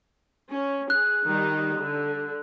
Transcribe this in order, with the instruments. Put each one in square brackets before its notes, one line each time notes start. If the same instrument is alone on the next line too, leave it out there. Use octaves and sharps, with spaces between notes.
[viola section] C#4
[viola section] G#4 [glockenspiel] F#6
[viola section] D#3 G3 D#4
D3